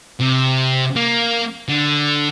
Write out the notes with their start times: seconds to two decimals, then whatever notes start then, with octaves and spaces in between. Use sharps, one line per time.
0.20 C3
0.96 A#3
1.69 D3